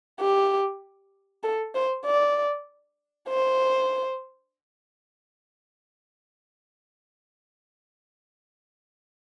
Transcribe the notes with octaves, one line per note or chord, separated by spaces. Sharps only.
G4
A4
C5
D5
C5